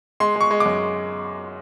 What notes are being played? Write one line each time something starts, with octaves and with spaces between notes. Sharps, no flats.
G#3 C6
G#3 C#6
G#3
D6
F#2